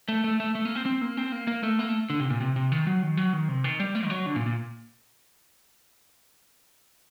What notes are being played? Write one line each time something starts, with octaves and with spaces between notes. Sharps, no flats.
A3
A3
A3
A3
A#3
C4
C4
A#3
C4
A#3
A#3
A3
A#3
A3
D3
C3
A#2
C3
C3
D#3
F#3
D#3
F#3
D#3
C3
D#3
G3
A3
D#3
F#3
D3
A#2
A#2